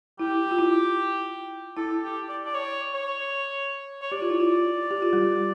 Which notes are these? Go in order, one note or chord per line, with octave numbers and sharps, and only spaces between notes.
E4 G4
F4
E4
E4 A4
G4
D5
D5
C#5
C#5
C#5
G4 D5
F4
E4
F4
G4
F4
G3 G4